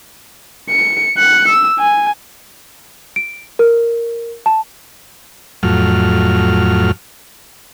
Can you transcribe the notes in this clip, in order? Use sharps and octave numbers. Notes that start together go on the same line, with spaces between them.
C#7
F#6 C#7
E6
G#5
D7
A#4
A5
F2 A2 F#3 F6